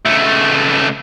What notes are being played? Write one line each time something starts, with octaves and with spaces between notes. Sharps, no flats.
C#2 A3